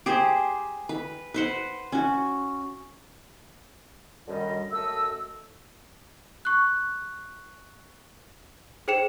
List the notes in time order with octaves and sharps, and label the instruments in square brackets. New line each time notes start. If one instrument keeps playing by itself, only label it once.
[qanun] G4 G#4 C5
B4
B4 C5 F#5
C#4 F#4
[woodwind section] F#2 D3 D#3 G3 F#4 D#5
F#2 A3 D#5 A5 E6
[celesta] C#6 F#6
G#4 C5 G5 C#7 E7